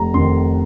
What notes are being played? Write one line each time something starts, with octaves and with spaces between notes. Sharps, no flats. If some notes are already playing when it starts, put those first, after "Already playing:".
Already playing: F1 A#5
F2 D#3 C6